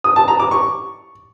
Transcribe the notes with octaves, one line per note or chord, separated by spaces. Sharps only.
D#6
A5
A#5
D6
C#6